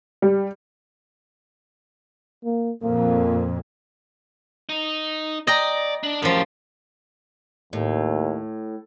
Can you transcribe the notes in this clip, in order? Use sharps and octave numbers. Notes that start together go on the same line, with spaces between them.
G3
A#3
F2 A#2 A#3
D#4
D5 D#5 G5 A#5
D4
F#2 A2 F3 G4
D#2 A2